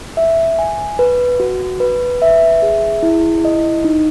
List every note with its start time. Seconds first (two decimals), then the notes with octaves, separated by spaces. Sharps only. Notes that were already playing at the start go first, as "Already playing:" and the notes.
0.17 E5
0.59 G#5
0.99 B4
1.40 F#4
1.80 B4
2.22 E5
2.62 G#4
3.03 E4
3.45 D#5
3.84 D#4